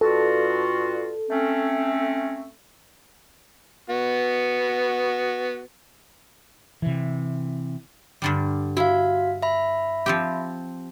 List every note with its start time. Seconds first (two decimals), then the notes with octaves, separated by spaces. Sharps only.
0.01 G2 F4 F#4 A4
1.31 A3 C4 C#4
3.90 B3 F#4
6.82 C3 E3
8.22 G2 D3 G3
8.77 E4 F#4 F5
9.42 E5 B5
10.06 F3 C4 G4